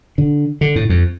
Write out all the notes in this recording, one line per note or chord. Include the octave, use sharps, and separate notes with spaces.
D3
D3
A2
F2